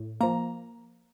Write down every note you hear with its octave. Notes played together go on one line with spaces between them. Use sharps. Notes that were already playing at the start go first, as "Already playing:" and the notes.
Already playing: A2
F3 A#3 A#5